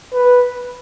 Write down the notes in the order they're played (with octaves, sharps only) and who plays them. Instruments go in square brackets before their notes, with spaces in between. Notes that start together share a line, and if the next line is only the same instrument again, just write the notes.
[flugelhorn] B4